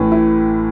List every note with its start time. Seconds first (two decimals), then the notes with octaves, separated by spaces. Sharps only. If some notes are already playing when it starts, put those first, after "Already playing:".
Already playing: A1 A2 E3
0.12 E4